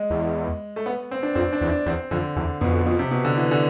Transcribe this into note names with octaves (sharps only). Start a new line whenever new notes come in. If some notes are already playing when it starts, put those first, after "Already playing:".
Already playing: G#3
E2
A3
B3
C4
D4
F2 C4
D4
E2
D4
E2 C4
F2 D3
E2 D3
F2 B2
B2
C3
B2
D3
E3
D3